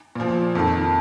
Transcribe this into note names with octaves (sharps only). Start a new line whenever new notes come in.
A#2 F3
F2 D#3